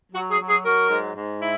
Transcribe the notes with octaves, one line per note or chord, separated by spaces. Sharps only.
F#3 F#4
G#4
F#3
G#4
F#3 F#4 A#4
G#2
G#2
E4